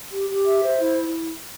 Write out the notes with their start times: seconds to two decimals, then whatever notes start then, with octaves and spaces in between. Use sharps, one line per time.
0.12 G4
0.29 G4
0.46 E5
0.63 C5
0.80 E4
0.97 E4